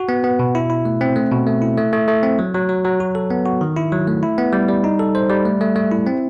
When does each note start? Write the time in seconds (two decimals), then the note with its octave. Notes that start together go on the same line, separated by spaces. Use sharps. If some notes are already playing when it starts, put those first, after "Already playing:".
Already playing: F#4
0.09 B3
0.24 B3
0.39 B2
0.55 E4
0.70 E4
0.85 A3
1.01 C4
1.16 A3
1.32 B2
1.47 A3
1.62 E4
1.77 A3
1.93 A3
2.08 A3
2.23 C4
2.39 F#3
2.54 F#3
2.69 F#3
2.85 F#3
3.00 F#4
3.15 A4
3.31 B3
3.46 F#4
3.61 D#3
3.77 E4
3.92 F#3
4.07 A3
4.23 E4
4.38 B3
4.53 G3
4.68 G3
4.84 D#4
4.99 A4
5.15 C5
5.30 G3
5.45 A3
5.61 A3
5.76 A3
5.91 E4
6.07 C4